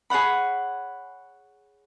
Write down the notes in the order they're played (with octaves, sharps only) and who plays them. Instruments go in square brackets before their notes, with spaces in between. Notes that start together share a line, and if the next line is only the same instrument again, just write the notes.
[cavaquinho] G#4 C#5 F#5 B5